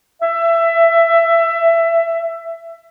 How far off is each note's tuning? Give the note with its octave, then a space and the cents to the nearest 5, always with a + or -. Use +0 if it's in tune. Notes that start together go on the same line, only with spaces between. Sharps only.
E5 +20